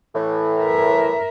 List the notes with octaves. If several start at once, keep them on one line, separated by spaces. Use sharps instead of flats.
A2 E3
A#4 E5